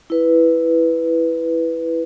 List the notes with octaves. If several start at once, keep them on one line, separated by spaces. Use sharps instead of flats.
E4 B4